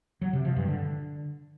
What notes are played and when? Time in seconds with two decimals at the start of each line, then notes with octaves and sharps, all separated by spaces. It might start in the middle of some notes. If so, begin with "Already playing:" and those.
0.21 F#3
0.33 C3
0.45 F3
0.56 G2
0.68 D3